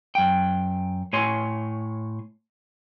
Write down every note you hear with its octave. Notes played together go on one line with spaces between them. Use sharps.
F#2 G5
A2 C#5 G#5 C6